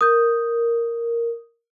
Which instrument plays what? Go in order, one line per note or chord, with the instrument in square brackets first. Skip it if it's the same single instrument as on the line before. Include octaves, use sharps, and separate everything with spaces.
[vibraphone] A#4 [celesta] D#6 G6